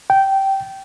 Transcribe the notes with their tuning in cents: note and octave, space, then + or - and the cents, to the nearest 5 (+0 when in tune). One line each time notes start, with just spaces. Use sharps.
G5 -15